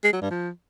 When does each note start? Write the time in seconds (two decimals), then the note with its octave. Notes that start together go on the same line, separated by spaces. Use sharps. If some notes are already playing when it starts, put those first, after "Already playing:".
0.04 G#3
0.13 F#3
0.22 G2
0.30 F3